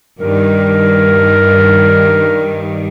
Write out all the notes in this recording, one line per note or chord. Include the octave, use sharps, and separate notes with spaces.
G2 D#3 G3 A#4